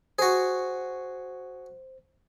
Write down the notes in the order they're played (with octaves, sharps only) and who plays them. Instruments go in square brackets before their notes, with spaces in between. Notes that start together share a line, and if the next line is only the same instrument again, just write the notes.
[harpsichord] F#4 G#4 [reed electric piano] C5